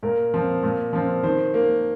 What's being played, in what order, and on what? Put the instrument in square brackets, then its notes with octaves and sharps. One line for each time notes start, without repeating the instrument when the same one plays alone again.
[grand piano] A#2 A#4
F3 C4
A#2
F3 C4
D#3 C5
A#3